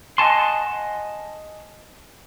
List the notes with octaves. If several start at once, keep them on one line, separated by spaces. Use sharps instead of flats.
D#5 F#5 G#5 A5 C6